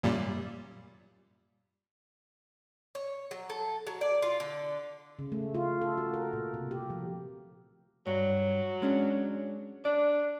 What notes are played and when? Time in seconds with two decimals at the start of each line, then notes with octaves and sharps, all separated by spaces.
0.03 F#2 A#2 G3
2.95 C#5
3.31 F#3
3.50 A4
3.87 F#3
4.01 D5
4.22 F4
4.40 D3
5.19 C#3
5.32 A3
5.54 F4
5.81 A4
5.98 F#4
6.14 A#4
6.33 A#2
6.54 C3
6.71 G4
6.90 F3
8.07 G2 F#3
8.82 G#3 C#4 D4
9.85 D4 D5